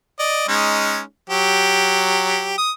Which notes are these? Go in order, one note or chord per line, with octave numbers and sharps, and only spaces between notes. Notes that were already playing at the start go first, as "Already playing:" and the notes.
D5 D#5
G#3 C#4 D#4
F#3 G4
D#6